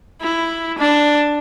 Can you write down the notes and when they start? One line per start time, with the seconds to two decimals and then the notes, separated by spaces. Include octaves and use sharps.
0.22 E4
0.79 D4